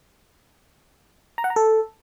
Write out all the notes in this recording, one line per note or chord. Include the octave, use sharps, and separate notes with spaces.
A#5
F#5
A#5
A4